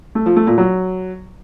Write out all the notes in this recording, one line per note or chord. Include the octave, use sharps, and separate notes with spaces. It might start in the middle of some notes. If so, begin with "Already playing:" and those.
A3
F3
A3
A#2
F#3